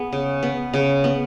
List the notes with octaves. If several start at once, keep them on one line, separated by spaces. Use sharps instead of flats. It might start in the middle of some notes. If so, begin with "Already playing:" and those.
Already playing: B3 G#4
C#3
B3
C#3
B3